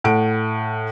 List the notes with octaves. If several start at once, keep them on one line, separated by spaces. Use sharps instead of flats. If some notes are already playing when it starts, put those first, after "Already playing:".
A2 F#5 D7